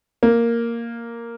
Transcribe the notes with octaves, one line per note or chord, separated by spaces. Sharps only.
A#3